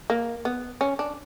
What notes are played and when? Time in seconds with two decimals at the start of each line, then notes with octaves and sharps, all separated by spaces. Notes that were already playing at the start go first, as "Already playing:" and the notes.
0.10 A#3
0.45 B3
0.81 C#4
0.99 D4